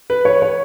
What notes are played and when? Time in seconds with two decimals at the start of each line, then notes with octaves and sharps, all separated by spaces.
0.10 B4
0.25 C#5
0.42 C#5